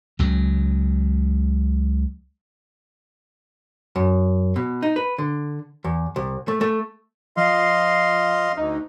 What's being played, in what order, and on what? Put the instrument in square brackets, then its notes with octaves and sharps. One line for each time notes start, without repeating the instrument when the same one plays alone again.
[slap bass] C#2 C#3 F#3
[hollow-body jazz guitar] F#2
B2
D#4
B4
D3
E2
C2
A3
A3
[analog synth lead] F3 [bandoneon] D#5 F5 C6
[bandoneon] D2 [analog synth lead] D#4